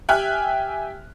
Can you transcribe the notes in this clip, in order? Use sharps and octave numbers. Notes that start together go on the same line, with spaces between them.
G4 E5 G5 G#5 F6 F#6